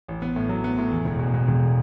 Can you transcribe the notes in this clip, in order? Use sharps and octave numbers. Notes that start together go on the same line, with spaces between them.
A1
B3
A2
F#3
B3
A2
E2
E1
B2
B2
E1